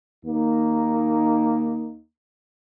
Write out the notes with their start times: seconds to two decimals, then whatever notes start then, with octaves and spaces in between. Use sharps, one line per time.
0.25 D#2 A#3 D#4